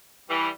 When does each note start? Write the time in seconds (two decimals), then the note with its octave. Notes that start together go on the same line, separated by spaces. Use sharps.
0.29 E3 G3